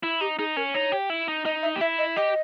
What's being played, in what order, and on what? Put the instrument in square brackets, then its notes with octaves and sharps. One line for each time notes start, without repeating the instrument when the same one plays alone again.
[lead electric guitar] E4
[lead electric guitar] D#4 [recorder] G4
[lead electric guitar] D#4 [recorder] G#4
[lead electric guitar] C#4 [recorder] A#4
[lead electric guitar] D#4 [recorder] C#5
[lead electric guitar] G4
E4
D#4
[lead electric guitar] D#4 [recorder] D#5
[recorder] E5
[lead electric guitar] G4
[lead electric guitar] E4 [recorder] E5
[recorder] D#5
[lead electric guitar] G4 [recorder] D#5